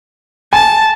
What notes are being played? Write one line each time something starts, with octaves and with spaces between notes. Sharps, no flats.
G#5 A5